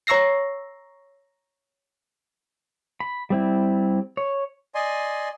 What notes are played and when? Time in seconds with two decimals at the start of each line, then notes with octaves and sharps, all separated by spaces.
0.07 C#5 A#5 C#6 E6 A#6 C7
3.00 B5
3.30 G3 C4 E4
4.17 C#5
4.75 D5 D#5 G#5 C6